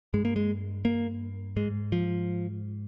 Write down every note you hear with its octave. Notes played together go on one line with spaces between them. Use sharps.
G2 G#3
A#3
G#3
A#3
G#2 G#3
F3